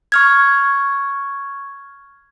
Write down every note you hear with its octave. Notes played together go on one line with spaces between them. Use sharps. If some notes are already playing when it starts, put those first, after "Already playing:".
C#6 F6 G#6